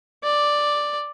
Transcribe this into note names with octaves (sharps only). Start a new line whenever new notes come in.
D5